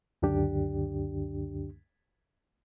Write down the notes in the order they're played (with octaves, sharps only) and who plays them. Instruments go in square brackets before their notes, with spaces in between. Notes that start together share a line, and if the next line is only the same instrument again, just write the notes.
[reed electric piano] C#2 F#2 D3 D4 G4